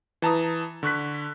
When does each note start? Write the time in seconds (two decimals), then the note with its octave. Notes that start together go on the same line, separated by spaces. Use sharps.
0.22 E3 A5 A#5 D#6
0.83 D3 C#6 F#6 B6